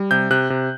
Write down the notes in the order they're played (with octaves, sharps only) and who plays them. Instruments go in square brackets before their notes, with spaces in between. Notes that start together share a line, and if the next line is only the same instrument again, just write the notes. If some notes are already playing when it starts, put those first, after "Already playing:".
Already playing: [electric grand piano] G3
C3 G6
C3 F#6
C3